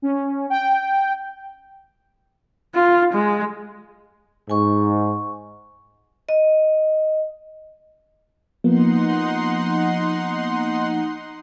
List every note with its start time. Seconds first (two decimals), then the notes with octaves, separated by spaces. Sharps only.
0.02 C#4
0.50 G5
2.75 F4
3.13 G#3
4.50 G#2 G#5 C#6
6.29 D#5
8.64 F3 A#3 B3 D#4 F#5 C6